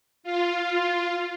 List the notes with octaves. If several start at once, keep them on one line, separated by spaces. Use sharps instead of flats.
F4